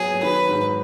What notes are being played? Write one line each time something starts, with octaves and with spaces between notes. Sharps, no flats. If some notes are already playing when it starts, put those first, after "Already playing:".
Already playing: F#3 B3 G#4
F#3
D#3 B4
G#2